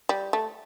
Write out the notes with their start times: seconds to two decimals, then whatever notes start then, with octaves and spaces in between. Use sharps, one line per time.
0.09 G3
0.33 A3